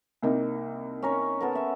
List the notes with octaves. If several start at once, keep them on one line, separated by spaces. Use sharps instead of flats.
C2 A#3 D#4
C#4 A#4 C#5
B3 A4 A#4
E5